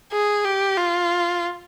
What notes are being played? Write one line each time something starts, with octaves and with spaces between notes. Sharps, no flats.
G#4
G4
F4